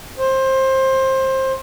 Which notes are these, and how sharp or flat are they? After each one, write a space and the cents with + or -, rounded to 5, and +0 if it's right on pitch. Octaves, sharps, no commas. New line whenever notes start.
C5 +20